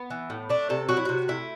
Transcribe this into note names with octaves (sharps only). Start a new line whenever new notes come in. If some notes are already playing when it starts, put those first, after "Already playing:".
Already playing: B3
E3
A2
A3 D4
C3 A4
F#3 F#4
E4
C3 F#4
A3 E4